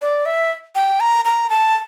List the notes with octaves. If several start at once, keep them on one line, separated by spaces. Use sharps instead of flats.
D5
E5
G5
A#5
A#5
A5